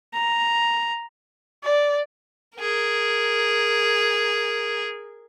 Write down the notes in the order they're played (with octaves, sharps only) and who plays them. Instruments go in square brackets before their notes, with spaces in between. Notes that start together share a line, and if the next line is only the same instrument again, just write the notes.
[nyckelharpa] A#5
[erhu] D5
[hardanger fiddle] G#4 A#4